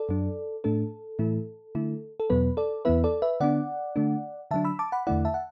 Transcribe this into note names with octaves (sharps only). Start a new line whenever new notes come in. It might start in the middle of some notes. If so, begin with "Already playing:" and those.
Already playing: A4 D5
F#2 F#3 D4
A2 A3 D4 A4
A2 E3 A3 E4
D3 A3 E4
A4
E2 B2 F#3 B3 B4
A4 D5
E2 E3 B3 E4 B4 E5
A4 D5
B4 E5
D3 B3 D4 D5 F#5
D3 A3 D4
D3 F#3 D4 E5 A5
B5 E6
A5 D6
F#5 B5
E2 D3 A3 E4 D5 F#5
E5 A5
F#5